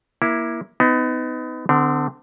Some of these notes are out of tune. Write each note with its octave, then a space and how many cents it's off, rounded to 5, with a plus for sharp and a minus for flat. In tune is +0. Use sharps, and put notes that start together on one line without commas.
A#3 +20 E4 +0
B3 +35 D#4 +20
D3 +20 C4 -35